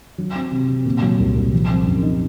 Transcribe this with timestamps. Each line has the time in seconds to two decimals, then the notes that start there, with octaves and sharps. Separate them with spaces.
0.18 F#3
0.35 C4
0.51 C3
0.68 C3
0.85 A#2
1.02 F#3
1.19 C2
1.36 C2
1.53 F3
1.70 C4
1.86 F#2
2.03 D#4